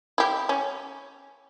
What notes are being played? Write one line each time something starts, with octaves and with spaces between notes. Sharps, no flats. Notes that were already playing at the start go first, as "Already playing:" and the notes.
E4 G4
C#4